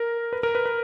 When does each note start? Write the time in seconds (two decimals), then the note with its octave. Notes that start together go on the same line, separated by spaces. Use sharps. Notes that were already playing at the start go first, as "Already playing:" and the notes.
Already playing: A#4
0.33 B4
0.43 A#4
0.55 B4
0.66 B4